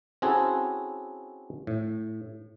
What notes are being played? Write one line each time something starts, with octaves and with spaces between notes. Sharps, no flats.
C4 C#4 E4 F#4 G#4 A4
A2